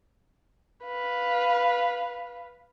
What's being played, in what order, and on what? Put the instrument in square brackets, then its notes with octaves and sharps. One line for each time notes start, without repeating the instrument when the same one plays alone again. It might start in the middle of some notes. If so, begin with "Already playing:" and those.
[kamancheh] B4 F5